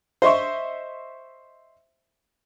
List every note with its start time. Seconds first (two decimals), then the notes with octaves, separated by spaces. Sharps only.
0.22 C5 D#5 E5 C6 C#6